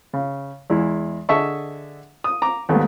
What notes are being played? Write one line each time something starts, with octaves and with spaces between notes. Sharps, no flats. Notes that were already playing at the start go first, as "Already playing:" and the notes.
C#3
E2 G#3 E4
D3 G#4 D#5 E5 A5 C#6
D#6
A#5 D6
D#2 G#2 G3 A3 B3